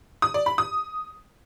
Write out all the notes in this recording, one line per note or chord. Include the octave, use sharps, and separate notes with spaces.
D#6
D5
B5
D#6